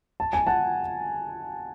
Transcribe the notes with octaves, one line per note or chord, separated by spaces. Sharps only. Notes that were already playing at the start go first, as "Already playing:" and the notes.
A5
G#5
F#5 A5